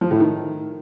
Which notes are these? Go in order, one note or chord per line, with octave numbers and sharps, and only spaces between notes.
F3
A2
D#3